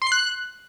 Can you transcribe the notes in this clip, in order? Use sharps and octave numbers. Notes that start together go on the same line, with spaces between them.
C6
C7
F#6